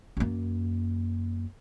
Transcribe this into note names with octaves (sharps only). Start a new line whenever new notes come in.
F#2 A#3